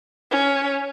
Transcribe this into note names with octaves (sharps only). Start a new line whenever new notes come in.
C#4